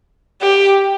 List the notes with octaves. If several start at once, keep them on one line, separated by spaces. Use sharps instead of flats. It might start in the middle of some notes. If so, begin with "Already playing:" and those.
G4